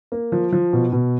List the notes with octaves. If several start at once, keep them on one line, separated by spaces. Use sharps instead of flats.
A#3
F3
F3
B2
B2